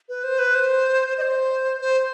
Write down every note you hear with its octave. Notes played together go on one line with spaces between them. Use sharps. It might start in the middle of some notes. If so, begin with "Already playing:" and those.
B4
C5
B4
C5
D#5
C5
C5